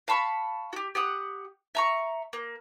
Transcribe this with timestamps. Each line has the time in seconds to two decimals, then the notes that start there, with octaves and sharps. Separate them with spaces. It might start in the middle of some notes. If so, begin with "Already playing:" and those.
0.08 F5 A5 B5 C#6
0.73 F#4 G4
0.95 G4 F#5 D#6
1.75 E5 A#5 C#6
2.33 A#3